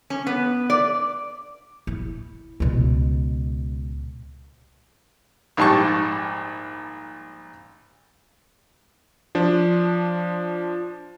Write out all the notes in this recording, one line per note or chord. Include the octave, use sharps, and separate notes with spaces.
C#4
B3
D5
E4
C#2 B2
A#1 G#2 G3 A5 C#6
F3 D4